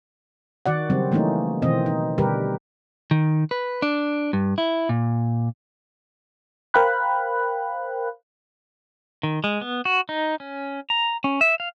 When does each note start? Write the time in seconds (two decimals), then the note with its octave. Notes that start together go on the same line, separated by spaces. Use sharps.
0.66 D#3 F#4 D5 F#5
0.90 C#3 F#3 G3 C4
1.12 E3 A3 A#3 C#4 D#4
1.62 B2 D#3 E3 C4 D#5
1.86 D#4
2.18 B2 D3 G3 G4 A#4 B4
3.11 D#3
3.51 B4
3.82 D4
4.33 G2
4.58 E4
4.89 A#2
6.74 A#4 C5 F5 G5 B5 F#6
9.23 D#3
9.44 G#3
9.61 B3
9.85 F#4
10.09 D#4
10.40 C#4
10.90 A#5
11.24 C#4
11.41 E5
11.60 F5